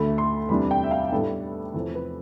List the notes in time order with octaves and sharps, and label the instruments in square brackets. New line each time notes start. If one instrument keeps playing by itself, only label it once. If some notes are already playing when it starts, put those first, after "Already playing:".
Already playing: [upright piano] D2 D3 A3 B5
C6
E2 C3 G3 D4 B5
G5
E5
F5
A2 G3 B3 D4 A4
E2 C3 F3 C4 A4
B4